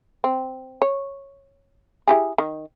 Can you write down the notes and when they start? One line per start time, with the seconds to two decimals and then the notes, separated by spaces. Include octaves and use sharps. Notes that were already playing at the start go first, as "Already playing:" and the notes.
0.24 C4
0.82 C#5
2.07 E4 G4 G#4
2.38 D#3